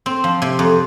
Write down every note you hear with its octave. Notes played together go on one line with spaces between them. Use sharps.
C4
F3
C3
F2